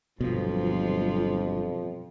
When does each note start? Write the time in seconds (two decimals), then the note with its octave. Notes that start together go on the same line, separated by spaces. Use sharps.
0.20 G1 F2 B2 F3 F#3